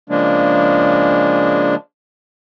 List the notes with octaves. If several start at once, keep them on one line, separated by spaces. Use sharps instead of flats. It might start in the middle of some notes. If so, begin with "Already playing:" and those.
C#3 F3 G#3 A#3 D4